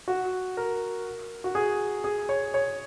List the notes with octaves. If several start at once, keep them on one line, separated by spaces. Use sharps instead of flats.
F#4
A#4
F#4
G#4
G#4
C#5
C#5